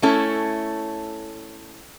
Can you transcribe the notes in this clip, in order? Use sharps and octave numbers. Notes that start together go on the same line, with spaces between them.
A3 C#4 E4 A4 C#5